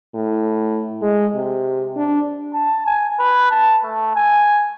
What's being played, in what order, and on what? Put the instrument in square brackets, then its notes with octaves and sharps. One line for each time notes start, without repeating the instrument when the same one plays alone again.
[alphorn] A2
G#3
C3
D4
[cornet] A5
G#5
B4
A5
A3
G#5